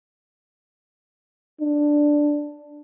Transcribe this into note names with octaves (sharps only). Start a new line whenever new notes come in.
D4